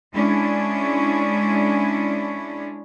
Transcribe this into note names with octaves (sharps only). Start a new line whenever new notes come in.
G#3 C#4 D4 E4